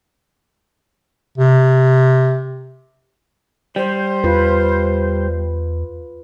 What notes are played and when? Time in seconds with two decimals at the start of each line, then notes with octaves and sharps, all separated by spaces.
1.38 C3
3.76 G3 C5
4.24 E2 F4 B4